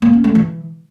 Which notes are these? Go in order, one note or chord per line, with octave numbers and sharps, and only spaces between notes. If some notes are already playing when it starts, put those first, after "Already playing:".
A#3
C#4
A3
E3